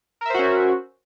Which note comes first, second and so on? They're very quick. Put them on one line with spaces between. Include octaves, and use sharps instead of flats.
A#4 E5 C5 F#4 C#4